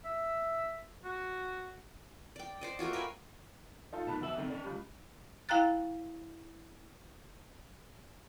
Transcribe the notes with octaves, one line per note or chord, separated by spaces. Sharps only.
E5
F#4
D5 G5
C5 D5 D#5
A3 A#3 F4 F#4
A#4 B4 G5 G#5
D#4 F4 A4
B2 D#3 A5 B5 F#6
B2 D#3 E5 E6 F#7
D3 D#3 C4 A4
C#4 D5
C#2 G3
E4 F5 G5 A#5 F#6 A6